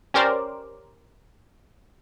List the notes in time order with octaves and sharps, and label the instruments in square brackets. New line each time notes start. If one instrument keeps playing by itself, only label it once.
[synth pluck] C#4 G4 A#4 C5 D5